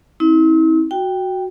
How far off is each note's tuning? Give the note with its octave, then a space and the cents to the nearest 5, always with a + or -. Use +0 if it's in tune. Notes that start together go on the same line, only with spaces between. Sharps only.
C4 +20 E4 -40
F#4 +0 G5 +0